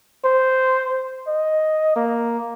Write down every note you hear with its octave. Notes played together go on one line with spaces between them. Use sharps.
C5
D#5
A#3